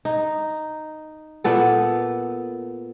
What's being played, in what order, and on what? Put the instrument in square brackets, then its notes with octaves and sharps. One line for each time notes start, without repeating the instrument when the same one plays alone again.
[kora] D#4
A#2 B3 A4